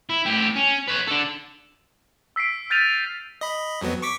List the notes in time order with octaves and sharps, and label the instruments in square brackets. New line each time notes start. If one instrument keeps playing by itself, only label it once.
[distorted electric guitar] E4
A2 G4
C#4
B4 C#5
D4 A4
[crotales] E6 B6 C7 D7
F6 G6 A6 B6 D#7 F7
[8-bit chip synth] D#5 B5
F2 F#3 B3
C#6 D6 B6